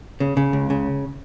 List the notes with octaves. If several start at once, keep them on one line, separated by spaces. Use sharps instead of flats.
C#3
C#3
C#2
C#3